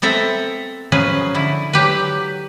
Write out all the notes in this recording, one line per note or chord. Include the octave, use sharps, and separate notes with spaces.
B3 C4 A4 E5 A#5
F3 F#3 C#4 G#4 B4
D3 E4
F#3 G4 B4